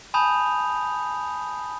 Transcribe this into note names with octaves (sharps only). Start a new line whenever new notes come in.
G#5 A5 B5 D#6 G6 F7